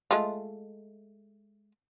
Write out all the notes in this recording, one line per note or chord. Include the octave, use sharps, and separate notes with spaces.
G#3 A3 F4